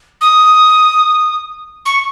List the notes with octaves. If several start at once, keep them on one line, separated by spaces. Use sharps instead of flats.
D#6
C#6